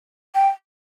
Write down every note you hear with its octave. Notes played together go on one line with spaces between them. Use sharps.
G5